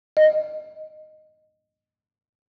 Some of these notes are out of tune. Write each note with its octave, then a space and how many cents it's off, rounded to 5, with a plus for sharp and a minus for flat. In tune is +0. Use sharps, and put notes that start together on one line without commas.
D#5 -10